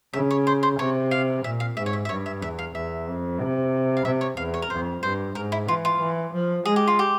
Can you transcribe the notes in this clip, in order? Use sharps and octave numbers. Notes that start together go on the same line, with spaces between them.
C#3 E5
C#5
C5
C5
C3 C#5
F5
A#2 E5
F5
G#2 E5
C#5
E5
E5
G2 C#5
E5
E2 E5
F5
E2 E5
F2
C3
F5
C3 E5
C#5
E2 F5
C#5
A#4
F2 C5
G2 C5
G#2 A#4
E4
E3 F4
F4
E3
F3
G#3 G#4
G4
F4
G4